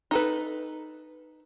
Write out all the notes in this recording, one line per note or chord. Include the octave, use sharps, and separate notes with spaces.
D#4 A4 B4